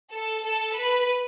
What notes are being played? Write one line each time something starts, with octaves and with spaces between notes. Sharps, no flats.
A4
A4
B4